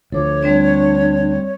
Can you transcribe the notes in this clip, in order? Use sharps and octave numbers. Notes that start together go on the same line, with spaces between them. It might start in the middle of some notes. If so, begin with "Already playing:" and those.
D2 F3 A4 C#5 D6
G3 C4 D4 D5